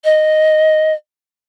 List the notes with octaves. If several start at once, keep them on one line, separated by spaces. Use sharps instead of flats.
D#5